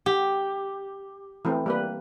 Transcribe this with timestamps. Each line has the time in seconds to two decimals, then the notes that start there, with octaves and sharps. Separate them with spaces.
0.06 G4
1.45 E3 A3 C4
1.66 G3 A#3 B4